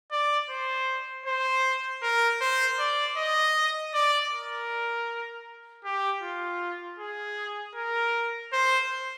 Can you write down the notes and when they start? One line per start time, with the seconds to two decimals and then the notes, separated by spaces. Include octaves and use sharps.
0.12 D5
0.50 C5
1.26 C5
2.02 A#4
2.41 C5
2.79 D5
3.17 D#5
3.94 D5
4.32 A#4
5.85 G4
6.23 F4
6.99 G#4
7.75 A#4
8.53 C5